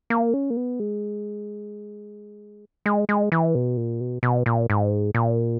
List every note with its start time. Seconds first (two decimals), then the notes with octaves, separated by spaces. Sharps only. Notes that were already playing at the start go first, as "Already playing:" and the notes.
0.10 A#3
0.34 C#4
0.50 A#3
0.57 B3
0.80 G#3
2.86 G#3
3.09 G#3
3.32 E3
3.55 B2
3.77 A#2
4.01 B2
4.23 B2
4.46 A#2
4.70 G#2
5.14 A#2